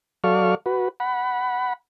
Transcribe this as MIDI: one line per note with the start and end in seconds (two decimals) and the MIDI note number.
0.24 0.55 54
0.24 0.55 69
0.24 0.55 74
0.24 0.55 77
0.24 0.55 85
0.24 0.55 89
0.66 0.89 66
0.66 0.89 71
1.00 1.73 78
1.00 1.73 83